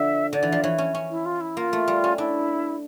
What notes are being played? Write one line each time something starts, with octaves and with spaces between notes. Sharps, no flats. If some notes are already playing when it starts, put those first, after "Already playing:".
Already playing: D3 F3 E5
D3 D5
E3
F3
E3 C#5
C#4
C#4
E4
F4
E4
A#3 F4
A3
G3
C#4
D4 E4